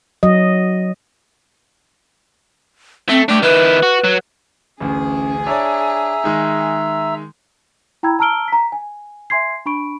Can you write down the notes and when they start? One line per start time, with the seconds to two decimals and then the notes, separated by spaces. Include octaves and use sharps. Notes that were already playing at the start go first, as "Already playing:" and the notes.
0.23 F#3 D#5
3.09 A3 C4
3.29 A3 D4 G4
3.43 D#3 E4 B4
3.83 F#4
4.04 F#3
4.80 A1 D2 C#4 G#4
5.47 D4 C#5 D5 E5 A#5 E6
6.24 D#3 G#3 D#4
8.03 E4 G5 A#5 B5 E6 G#6
8.19 A5 A#5 E6 F6 D7 G7
8.48 A#5 B6
8.72 G#5
9.30 E5 G#5 C6 G#6 C7
9.66 D4 B5 C#6 D7